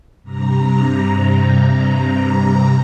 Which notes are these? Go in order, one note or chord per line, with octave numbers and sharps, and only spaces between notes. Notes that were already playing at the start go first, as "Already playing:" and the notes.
G2 C3 A#5